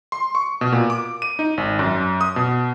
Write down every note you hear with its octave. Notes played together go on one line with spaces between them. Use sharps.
C6
C#6
B2
A#2
D6
D#7
D#4
G#1
F#2
D#6
B2